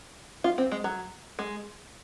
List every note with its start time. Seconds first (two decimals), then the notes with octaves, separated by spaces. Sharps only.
0.44 F4
0.58 C4
0.72 G#3
0.84 F#3
1.39 G#3